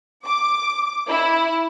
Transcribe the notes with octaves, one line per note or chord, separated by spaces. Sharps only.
D6
E4